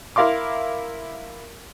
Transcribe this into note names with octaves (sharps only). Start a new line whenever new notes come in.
E4 A#4 F5 C6 D6